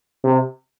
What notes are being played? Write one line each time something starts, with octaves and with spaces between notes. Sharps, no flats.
C3